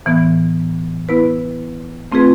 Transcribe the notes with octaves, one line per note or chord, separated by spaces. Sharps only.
A2 E3 B3
B3 E4 B4
A3 C4 F4 G#4 B4